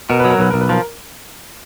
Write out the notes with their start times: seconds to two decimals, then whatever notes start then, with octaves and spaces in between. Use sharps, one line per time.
0.09 B2 A#4
0.20 F#3 B4
0.30 A#4
0.39 B1 B4
0.50 B1 A#4
0.61 B4
0.69 F3 A#4